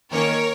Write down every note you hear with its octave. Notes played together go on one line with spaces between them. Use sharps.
D#3 A#3 C#4 A#4 C#5